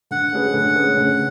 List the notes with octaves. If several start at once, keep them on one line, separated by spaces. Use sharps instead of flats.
D3 F#5
A3 C#4 G#4 B4
D3
A3 C#4 G#4 B4
C#3